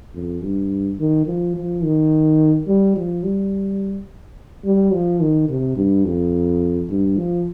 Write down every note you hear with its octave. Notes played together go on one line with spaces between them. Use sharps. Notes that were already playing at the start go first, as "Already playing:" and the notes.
F2
G2
D#3
F3
F3
D#3
G3
F3
G3
G3
F3
D#3
C3
G2
F2
G2
F3